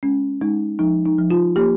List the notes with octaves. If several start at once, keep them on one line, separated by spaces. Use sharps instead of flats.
G#3 C#4
G#3 D#4
F3 D#4
D#4
F3
F4
A#3 G4